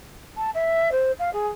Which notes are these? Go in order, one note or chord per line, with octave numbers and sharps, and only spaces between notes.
A5
E5
C5
F5
G#4